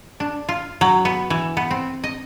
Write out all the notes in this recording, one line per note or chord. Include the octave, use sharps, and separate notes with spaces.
D4
F4
F#3
B3
E3
B3
C4
D#5